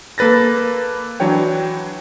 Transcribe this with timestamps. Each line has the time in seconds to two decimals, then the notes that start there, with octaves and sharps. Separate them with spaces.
0.18 A#3 A4 B4 A6 A#6
1.20 E3 F#3 D4 C#5 G5